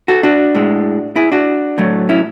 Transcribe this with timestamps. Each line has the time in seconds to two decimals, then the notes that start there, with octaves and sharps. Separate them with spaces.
0.08 F#4 A4
0.23 D4 F#4
0.55 A2 G#3
1.16 E4 G#4
1.32 D4 F#4
1.78 A2 F#3 A3
2.09 C#4 E4